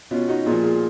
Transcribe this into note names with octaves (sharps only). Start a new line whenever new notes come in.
B2 C#4 F4
D#4 F#4
A#2 F3 F4 G#4
F4 G#4